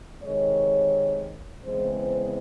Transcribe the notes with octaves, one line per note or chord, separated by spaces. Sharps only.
C3 D#3 G#3 C#5
E2 C#3 E3 G#3 C4 C5
C5